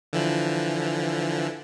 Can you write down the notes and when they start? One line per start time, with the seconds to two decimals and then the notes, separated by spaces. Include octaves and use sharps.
0.13 D3 E3 F3